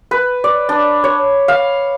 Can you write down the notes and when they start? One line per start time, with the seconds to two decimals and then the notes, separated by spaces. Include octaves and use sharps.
0.11 B4
0.44 D5
0.69 D4
1.04 C#5
1.48 F5